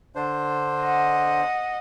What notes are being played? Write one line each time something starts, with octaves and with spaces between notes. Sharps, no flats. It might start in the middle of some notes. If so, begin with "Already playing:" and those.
D3 D4 C5
D#5 F#5